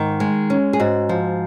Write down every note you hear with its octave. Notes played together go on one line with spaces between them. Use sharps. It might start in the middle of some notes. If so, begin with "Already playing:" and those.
Already playing: G#2 D#3
G#3
C#4
G#4
G#2 F#4
F3